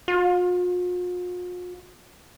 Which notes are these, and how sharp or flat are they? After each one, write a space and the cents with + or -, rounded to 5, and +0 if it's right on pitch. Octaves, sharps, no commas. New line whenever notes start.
F4 +45